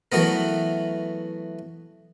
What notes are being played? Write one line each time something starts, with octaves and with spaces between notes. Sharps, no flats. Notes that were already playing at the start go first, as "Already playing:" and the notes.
E3 F#3 A3 B3 A#4